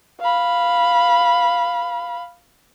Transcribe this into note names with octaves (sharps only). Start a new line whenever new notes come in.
F5 B5